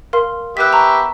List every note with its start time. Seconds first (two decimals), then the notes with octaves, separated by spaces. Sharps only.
0.13 A#4 F5 C6
0.57 B3 G4 E5 F#6 B6
0.73 A5 A#5 C#6